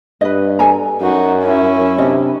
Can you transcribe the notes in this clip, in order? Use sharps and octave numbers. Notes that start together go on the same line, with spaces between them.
G2 B4 D#5
A4 G#5 A#5
F#2 D#4 F#4
C#4 E4
C3 D4 D#5